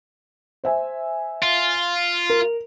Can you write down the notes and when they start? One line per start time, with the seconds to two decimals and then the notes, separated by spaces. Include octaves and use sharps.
0.64 C5 E5 G#5
1.42 F4
2.30 A#4